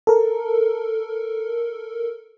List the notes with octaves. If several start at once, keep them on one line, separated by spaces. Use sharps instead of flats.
A4 A#4